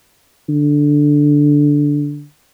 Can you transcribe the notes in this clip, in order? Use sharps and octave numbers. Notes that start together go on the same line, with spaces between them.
D3